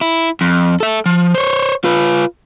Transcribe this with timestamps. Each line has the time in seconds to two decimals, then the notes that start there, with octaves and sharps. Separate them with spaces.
0.01 E4
0.41 F2
0.80 A4 E5
1.06 F3
1.35 C5 C#5
1.84 F4 B4